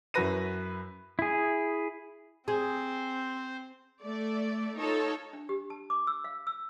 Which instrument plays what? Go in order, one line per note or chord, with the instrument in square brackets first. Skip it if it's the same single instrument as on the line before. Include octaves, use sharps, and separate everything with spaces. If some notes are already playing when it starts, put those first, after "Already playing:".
[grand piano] F#2 E4 F#4 B4 A#6 D#7
[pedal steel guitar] E4 G#4
[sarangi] C4 [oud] G#4 [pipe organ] C5
[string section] A3 D5
D#4 F4 A4 C#5
[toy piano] D4
G4
A5
D6
E6
F5
E6